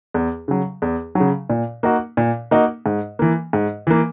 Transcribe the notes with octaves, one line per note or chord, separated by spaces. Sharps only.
E2
C#3 F#3
E2
C#3 F#3
A#2
A#3 D#4 F#4
A#2
A#3 D#4 F#4
G#2
E3 A#3
G#2
E3 A#3